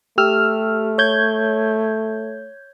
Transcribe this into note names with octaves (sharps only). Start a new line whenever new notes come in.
A3 G4 E6 F6
C#5 G6 G#6